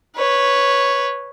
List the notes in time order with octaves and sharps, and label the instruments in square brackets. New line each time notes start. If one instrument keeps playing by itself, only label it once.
[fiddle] B4 C#5